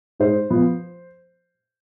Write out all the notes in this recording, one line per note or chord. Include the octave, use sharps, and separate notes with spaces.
G#2 C5
F3 B3